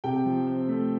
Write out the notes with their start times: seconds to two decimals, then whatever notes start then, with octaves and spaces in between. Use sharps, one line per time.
0.04 C3 G5
0.25 F3
0.47 C4
0.69 A3